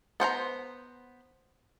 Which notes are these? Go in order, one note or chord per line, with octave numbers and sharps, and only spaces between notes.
B3 C5 F#5 A#5